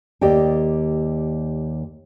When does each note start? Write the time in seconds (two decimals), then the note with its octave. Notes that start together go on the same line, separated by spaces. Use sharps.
0.21 D#2 G4 D5 D#5 G5